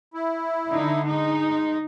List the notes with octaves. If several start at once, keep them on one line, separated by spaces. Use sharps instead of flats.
E4
D3 D#4
G#3 D#4